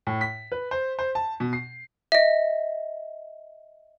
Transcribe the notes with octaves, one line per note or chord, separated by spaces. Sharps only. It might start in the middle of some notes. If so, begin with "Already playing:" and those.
A2
B6
B4
C5
C5
A5
B2
C7
D#5 E5